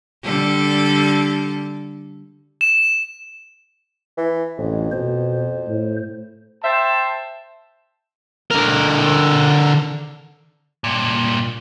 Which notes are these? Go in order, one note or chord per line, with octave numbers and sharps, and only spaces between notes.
D3 G3 A4
E7
E3
A1 F2
B2 C5
A2
C5 E5 G5 A5
D3 A#4
G2 A#2